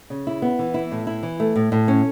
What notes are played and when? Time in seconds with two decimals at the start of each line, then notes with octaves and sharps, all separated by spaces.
0.10 C#3
0.27 E4
0.42 B3
0.59 E3
0.74 E4
0.91 A2
1.07 E4
1.23 E3
1.40 A3
1.56 A2
1.72 A2
1.88 C#4